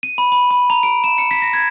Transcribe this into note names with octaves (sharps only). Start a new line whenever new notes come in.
D#7
B5
B5
B5
A#5
D7
E7
C#7
B6
A#6
G#6